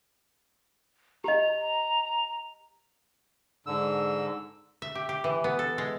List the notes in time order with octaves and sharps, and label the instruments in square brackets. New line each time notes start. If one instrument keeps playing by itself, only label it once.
[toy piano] G4 D#5 [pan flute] A#5
[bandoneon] G#2 D3 E6
[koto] E5
G4
G4
E3
B3
A4
G#3